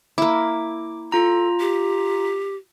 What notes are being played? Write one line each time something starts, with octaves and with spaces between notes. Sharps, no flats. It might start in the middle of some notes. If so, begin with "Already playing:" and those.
A#3 E4 D6
F4 A4 A#5
G4